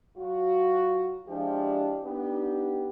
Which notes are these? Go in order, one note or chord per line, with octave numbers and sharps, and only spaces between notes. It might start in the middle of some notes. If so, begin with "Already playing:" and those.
F#3 F4 F#4
F3 G#3 D4 E4 G4
B3 D4 D#4 G4